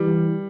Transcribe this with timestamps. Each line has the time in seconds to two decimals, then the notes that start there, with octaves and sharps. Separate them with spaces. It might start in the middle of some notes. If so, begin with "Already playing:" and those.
Already playing: E3 G3